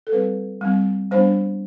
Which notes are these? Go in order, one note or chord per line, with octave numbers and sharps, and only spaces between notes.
A4
G3 C4 B4
G3 C4
G3 B3 D4 C5